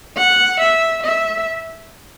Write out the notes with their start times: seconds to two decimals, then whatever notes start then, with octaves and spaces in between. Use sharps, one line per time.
0.18 F#5
0.60 E5
1.03 E5